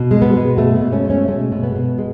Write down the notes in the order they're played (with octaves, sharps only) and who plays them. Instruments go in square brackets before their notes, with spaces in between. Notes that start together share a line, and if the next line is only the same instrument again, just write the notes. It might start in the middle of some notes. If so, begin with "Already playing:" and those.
Already playing: [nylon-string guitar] B2
G#3
B3
G#3
B2 A3
B2 B3
A3 C#4
G#3
A3 C#4
G#3 A3
B2
B3
B2
G#3